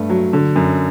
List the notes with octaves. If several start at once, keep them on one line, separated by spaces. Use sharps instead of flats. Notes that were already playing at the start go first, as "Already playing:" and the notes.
Already playing: G2 A3
F#3
D3
F#2